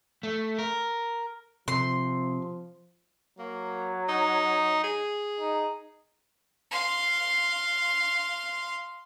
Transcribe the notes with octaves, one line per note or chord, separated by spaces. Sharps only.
A3
A#4
C3 F3 C6
F#3 A#3
D#4
G#4
D#4
F5 C6